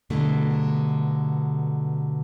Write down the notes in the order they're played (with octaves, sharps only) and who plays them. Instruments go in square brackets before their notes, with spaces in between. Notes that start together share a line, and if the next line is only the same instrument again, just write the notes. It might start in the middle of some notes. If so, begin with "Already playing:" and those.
[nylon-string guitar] G2 B2 D3 F#3 A3 E4